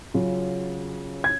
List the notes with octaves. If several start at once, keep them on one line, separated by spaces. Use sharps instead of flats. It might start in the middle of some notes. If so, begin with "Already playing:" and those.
C#3 F#3 C#4 F4
G#6